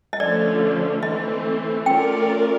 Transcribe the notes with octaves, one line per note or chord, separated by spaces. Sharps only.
D#5
D3 F3 A3 C#4 D5
E3 A3 C4 D#5
A3 C#4 F4 A#4 D5 G5